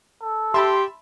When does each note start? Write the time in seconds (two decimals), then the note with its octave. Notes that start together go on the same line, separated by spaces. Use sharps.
0.21 A4
0.54 G4 E5 A5 B5 C6